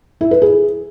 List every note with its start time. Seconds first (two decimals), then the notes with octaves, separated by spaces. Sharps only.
0.21 E4
0.31 B4
0.42 G#4